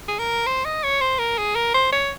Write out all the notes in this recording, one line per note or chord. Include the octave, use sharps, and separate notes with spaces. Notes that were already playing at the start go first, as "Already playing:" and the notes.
G#4
A#4
C5
D#5
C#5
C5
A#4
G#4
A#4
C5
C#5